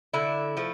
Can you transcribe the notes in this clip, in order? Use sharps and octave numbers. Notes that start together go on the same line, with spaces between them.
D3 E4
F3 A3